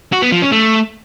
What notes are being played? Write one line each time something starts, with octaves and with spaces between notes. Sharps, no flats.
F#4
B3
F3
C#4
A3